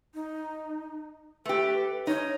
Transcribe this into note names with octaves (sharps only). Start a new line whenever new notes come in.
D#4
A3 G4 B4
D#4 C#5